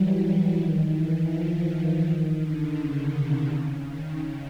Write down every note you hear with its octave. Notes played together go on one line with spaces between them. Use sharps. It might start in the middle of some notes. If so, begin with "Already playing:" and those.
Already playing: E3 F#3 G3
D#3
E3
F3
E3
D#3
D3
C#3
C3
C#3
D#3